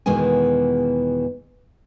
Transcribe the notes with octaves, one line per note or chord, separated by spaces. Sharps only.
E2 B2 D#3 E3 G#3 G#5